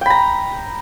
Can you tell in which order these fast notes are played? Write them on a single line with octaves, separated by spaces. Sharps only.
G5 B5 A#5